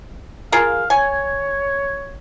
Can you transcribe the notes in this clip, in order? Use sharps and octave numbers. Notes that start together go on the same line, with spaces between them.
F4 G#4 A#4 F5
C#5 G#5